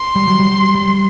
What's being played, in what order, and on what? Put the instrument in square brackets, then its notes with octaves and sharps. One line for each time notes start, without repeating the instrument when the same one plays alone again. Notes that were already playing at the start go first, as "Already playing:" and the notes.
Already playing: [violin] C6
[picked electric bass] G3
F#3
G3
G3